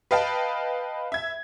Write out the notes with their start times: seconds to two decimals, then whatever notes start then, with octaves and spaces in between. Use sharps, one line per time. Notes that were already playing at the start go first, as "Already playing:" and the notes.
0.11 B4 D#5 F5 G5 A5 B5
1.12 E5 G#6